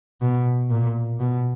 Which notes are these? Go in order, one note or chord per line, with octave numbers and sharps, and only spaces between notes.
B2
A#2
B2